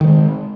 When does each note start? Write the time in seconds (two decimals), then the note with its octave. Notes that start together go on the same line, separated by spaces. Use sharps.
0.01 D#3
0.04 G3
0.08 G#3